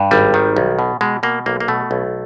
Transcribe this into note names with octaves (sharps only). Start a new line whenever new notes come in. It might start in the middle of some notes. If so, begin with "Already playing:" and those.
Already playing: G2
G#1 G3
D#3
B1
B2
B2 G#3
B2 A#3
B1 A#3
A#3
B2 A3
B1